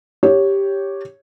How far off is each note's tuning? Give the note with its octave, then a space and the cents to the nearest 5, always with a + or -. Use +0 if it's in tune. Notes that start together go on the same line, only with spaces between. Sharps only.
G4 +0 C#5 +0